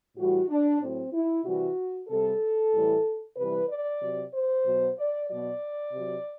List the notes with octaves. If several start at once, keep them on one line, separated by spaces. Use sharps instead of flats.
A2 E3 G3 F#4
D4
A2 F#3 C4
E4
C3 E3 G3 F#4
C3 G3 A4
A2 E3 G3
C3 E3 G3 B4
D5
C3 F#3
C5
B2 F#3
D5
B2 F#3 D5
C3 F#3